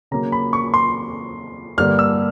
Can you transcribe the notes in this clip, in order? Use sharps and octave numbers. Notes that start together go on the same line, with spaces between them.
C#3 F#3 A#3 A#5
B5
C#6
C6
G2 D3 G3 A#3 D4 F6
E6